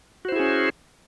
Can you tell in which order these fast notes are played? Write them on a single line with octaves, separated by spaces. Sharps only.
F#4 C5 E4 G#4 C#4